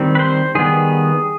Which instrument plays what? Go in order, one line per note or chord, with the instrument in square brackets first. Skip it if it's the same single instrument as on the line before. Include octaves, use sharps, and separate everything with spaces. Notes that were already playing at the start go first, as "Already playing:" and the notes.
Already playing: [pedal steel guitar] D#3 G3 C4
B4
C5
D#3 G3 B3 G#4